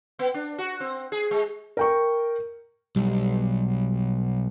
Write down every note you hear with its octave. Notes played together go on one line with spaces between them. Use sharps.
B3
D4
F#4
C4
G#4
G#3
A#4 G5 C#6
B1 G3